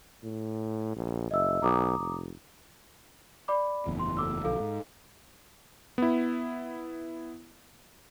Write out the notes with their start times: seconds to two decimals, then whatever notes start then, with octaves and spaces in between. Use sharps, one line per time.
0.23 A2
0.96 A#1
1.31 F#1 D#5 E5 E6
1.62 B1 A#5 D6 D#6
1.98 F1
3.48 D5 B5 D6
3.87 F#1 E2 A2
3.99 C6
4.17 A4 D6 E6
4.44 B1 D3 F3 A4 F5
4.60 G#2
5.98 B3 E4